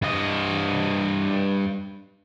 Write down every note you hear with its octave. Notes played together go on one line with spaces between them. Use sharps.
G2 D#5